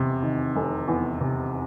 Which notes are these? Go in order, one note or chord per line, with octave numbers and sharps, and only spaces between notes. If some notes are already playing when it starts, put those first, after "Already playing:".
Already playing: F1 E2 C3
D#3
F1
E2
C3